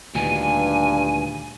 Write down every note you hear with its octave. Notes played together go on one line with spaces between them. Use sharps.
D2 G2 A#2 D#3 G#5